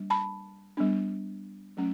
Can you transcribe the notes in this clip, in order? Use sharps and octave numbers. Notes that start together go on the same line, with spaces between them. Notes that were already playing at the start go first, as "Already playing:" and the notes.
Already playing: G3 A#3 D4
A5 B5
G3 B3 D4
F#3 A3 C#4